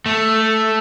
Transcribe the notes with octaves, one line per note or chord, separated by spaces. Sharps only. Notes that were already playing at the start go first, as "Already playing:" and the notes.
A3